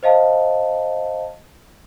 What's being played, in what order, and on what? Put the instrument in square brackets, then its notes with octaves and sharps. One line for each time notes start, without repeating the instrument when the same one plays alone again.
[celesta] C5 D#5 F5 A5